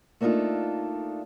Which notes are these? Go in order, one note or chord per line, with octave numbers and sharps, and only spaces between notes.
A3 A#3 D4 D#4 F4 A4